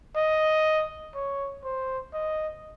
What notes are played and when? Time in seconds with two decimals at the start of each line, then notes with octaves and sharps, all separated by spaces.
0.16 D#5
1.15 C#5
1.64 C5
2.13 D#5